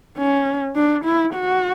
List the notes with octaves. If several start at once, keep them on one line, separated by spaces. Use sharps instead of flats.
C#4
D4
E4
F#4